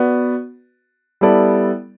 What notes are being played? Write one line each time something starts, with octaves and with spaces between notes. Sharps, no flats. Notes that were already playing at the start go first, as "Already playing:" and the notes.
Already playing: B3 F#4 B4 D5
G3 B3 E4 A4 D5